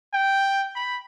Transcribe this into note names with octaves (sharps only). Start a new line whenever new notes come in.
G5
B5